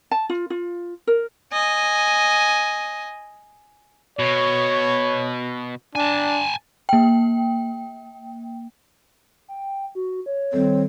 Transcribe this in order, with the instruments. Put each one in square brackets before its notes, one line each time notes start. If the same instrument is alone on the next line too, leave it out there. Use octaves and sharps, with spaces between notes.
[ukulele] A5
F4
F4
A#4
[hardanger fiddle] D#5 G#5
[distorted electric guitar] B2 [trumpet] C#5
[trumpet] D4 [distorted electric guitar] G#5 A5
[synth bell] A#3 G5
[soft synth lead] G5
F#4
C#5
[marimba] D#3 G3 A4 [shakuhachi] C4